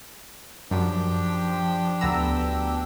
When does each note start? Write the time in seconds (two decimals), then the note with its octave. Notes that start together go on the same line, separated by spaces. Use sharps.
0.71 F#2 F3 D4 G4 G5
2.01 D2 B3 A#5 E6